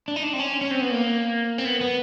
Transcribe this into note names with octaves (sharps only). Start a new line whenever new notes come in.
D4
D#4
D4
C4
C#4
C#4
C4
B3
A#3
C4
B3
B3